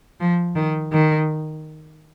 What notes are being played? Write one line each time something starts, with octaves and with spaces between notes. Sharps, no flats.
F3
D#3
D#3